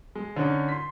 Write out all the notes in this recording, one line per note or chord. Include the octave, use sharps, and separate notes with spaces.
G#3
D3 C#4 D#4
C6 B6